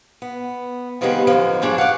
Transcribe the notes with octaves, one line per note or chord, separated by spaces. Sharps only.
B3
C3 D#3 F3 G3 G#3 B3
F#2 B2 D3 F3
G2 F3 D4 G#4 C#5 D5
D5 F5 F#5